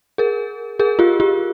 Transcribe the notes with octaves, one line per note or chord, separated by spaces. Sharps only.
G#4 A#4
G#4 A#4
F4 G4
F4 G4